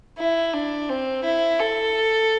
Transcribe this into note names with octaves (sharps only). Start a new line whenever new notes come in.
E4
D4
C4
E4
A4